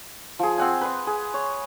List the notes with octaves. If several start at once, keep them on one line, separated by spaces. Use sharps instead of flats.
F3 G#4
C4 F#5 G#5
B4 C6
G#4
C#5